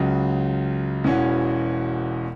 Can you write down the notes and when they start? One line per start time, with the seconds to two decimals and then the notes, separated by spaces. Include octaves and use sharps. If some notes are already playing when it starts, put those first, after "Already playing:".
Already playing: C#2 C#3 F#3
1.04 E1 E2 E3 C#4 F#4